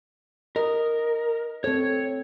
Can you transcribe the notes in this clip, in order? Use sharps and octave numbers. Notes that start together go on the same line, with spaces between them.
A#4 D#5
C4 A4 C#5